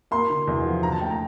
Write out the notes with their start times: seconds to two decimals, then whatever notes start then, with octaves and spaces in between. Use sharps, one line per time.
0.11 A#3 C6
0.30 D3
0.47 E2
0.65 F3
0.83 D3 A#5
0.92 A5
1.01 A3 G5
1.10 A#5